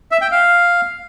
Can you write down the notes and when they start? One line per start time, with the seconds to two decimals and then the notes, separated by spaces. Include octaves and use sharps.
0.11 E5
0.21 G5
0.31 F5